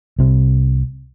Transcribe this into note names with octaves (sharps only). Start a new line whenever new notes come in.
C2 C3